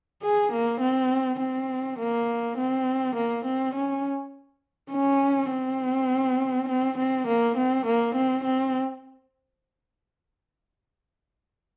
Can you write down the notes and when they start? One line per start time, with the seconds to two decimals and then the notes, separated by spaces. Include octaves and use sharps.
0.23 G#4
0.52 A#3
0.81 C4
1.40 C4
1.99 A#3
2.58 C4
3.15 A#3
3.45 C4
3.75 C#4
4.92 C#4
5.51 C4
6.69 C4
6.98 C4
7.27 A#3
7.57 C4
7.86 A#3
8.16 C4
8.45 C4